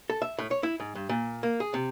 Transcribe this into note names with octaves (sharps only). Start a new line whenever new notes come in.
A4
E5
A2
C#5
E4
G#2
G2
A#2
A#3
G#4
C3